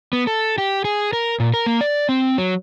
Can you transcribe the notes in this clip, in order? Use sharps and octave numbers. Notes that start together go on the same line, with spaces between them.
B3
A4
G4
G#4
A#4
A#2
A#4
A#3
D5
C4
F#3